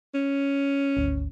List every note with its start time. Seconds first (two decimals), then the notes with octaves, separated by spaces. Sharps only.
0.14 C#4
0.97 G#1 D2